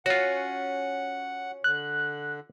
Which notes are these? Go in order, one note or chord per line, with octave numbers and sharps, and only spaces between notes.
C#4 F4 F#4 F#5
D3 F#6